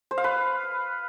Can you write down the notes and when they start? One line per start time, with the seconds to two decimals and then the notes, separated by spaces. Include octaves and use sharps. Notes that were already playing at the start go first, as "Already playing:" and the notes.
0.11 C5
0.18 F5
0.24 B4